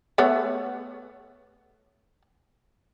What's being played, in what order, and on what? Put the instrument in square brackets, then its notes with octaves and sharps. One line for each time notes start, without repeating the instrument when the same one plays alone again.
[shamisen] A3 B3 C#5